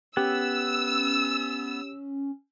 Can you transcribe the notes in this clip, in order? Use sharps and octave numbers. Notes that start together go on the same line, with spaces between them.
B3 C#4 G4 E6